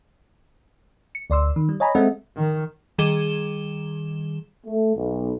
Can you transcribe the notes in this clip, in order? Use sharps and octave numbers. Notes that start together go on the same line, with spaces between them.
C#7
D2 D5 C6 E6
D#3
G3
C#5 D#5 G#5 A#5 B5
G#3 C4 A4 D#5 E5 F#5
D#3
D#3 G3 G#4 E7 G7
A3
B1